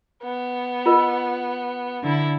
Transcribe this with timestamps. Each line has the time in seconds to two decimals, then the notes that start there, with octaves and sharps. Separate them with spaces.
0.24 B3
0.86 F4 A#4 D#5
2.03 D3 E4